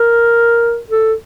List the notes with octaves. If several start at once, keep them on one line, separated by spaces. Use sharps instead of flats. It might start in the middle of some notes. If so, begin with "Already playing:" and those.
Already playing: A#4
A4